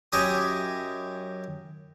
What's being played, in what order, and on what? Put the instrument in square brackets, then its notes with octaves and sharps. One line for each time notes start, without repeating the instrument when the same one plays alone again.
[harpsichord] F#2 G4 D#5 E5 G#5 D#6